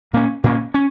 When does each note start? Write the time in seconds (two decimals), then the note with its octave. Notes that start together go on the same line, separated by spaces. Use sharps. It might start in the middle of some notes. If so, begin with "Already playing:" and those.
0.13 A#2 A#3 C#4
0.44 A#2 A#3 C#4
0.74 C#4